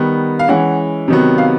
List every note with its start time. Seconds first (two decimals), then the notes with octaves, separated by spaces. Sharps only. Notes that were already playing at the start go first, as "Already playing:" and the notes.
Already playing: D#3 G3 B3
0.39 F5
0.48 E3 G#3 C#4 F#5
1.08 C3 D#3 F#3 B3
1.38 F5